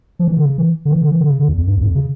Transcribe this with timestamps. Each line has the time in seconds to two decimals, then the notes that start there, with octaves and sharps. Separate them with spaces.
0.19 F3
0.28 E3
0.37 D3
0.46 C#3
0.58 E3
0.85 D3
0.92 E3
1.01 D3
1.11 E3
1.21 D3
1.30 C#3
1.39 D3
1.48 E2
1.58 F2
1.67 G2
1.77 E2
1.81 G2
1.86 F2
1.95 C#3